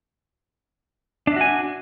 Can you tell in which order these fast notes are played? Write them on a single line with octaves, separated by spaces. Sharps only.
D4 E5 F#4 G#5